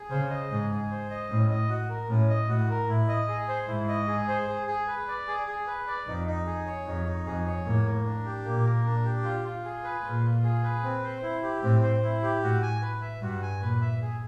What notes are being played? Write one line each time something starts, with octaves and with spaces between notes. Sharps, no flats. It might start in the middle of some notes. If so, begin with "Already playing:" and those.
Already playing: G#4
C#3 C5
D#5
G#2 G#4
G#4
C5
D#5
A2 C#4
D#5
F#4
A#4
A2 C#4
D#5
A2 F#4
A#4
A2 E4
D#5
G#4
C5
G#2 E4
D#5
G#4
C5
G#4
G#4
B4
D5
G#4
G#4
B4
D5
F2 D#4
D#4
G#4
C#5
F2 D#4
D#4
F2 G#4
C#5
A2 A#3
A#4
D4
G4
A#2 A#3
A#4
D4
G4
F4
F4
G#4
B4
A#2 F4
F4
G#4
B4
C4
C5
E4
G4
A2 C4
C5
E4
G4
A2 F#4
G#5
B4
E5
G2 F#4
G#5
A#2 B4
E5
G#4